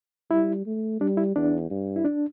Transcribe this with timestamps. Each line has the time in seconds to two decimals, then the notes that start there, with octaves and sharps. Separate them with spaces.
0.31 G3 E4
0.66 A3
1.00 G3 D4
1.17 E4
1.35 E2 D4
1.70 G2
1.96 E4
2.04 D4